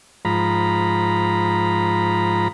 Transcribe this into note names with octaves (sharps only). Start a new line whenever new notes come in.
G#2 F3 A#5 B5